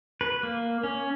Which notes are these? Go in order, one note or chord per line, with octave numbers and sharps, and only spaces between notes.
B4
A#3
C#4